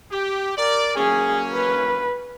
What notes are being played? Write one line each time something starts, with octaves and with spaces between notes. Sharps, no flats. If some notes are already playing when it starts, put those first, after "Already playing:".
G4
A#4 D5
F#3 A#3 C#4 G#4
B4